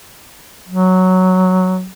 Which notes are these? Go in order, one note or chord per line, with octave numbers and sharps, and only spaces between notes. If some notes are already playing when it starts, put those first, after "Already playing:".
F#3